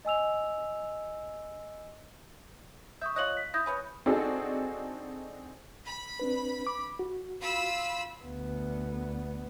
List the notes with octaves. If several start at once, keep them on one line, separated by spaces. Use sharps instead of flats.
D#5 G#5 E6 F7
E5 C#6 D#6 G6
F4 C#5 D#5 F#6 F#7
B6
E4 D#6 G6 A#6
C#4 B4 C#5
C4 D4 D#4 F#4 G#4 A4
B5
C4 D4 B4
D6
F#4
F4 B5 E6
D2 B3